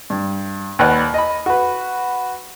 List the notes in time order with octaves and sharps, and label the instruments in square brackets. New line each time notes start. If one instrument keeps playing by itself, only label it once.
[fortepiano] G2
D#2 B4 D5 F#5 F#6
D#5 B5
F#4 B4